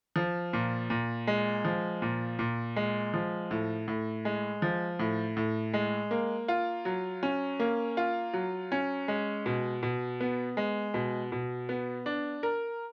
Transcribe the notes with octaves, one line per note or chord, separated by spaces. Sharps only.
F3
A#2
A#2
G#3
F3
A#2
A#2
G#3
F3
A2
A2
G#3
F3
A2
A2
G#3
A#3
F4
F#3
C#4
A#3
F4
F#3
C#4
G#3
B2
B2
B3
G#3
B2
B2
B3
D4
A#4